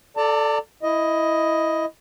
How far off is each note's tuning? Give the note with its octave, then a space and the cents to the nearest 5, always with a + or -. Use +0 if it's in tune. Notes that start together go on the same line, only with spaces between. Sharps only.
A4 +0 D5 +0 A5 +45
E4 +0 D#5 +10